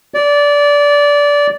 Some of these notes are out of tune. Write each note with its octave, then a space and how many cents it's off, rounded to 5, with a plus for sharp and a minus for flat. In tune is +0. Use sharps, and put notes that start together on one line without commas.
D5 -20